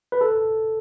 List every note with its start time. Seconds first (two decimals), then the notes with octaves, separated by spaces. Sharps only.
0.12 B4
0.21 A4